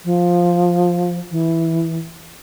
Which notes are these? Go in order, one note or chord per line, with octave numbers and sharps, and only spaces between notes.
F3
E3